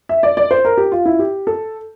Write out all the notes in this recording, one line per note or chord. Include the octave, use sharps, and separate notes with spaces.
E5
D5
D5
C5
A#4
G4
F4
E4
G4
A4